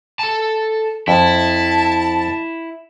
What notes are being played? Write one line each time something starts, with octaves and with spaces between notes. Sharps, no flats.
A4 A5
F2 E4 A5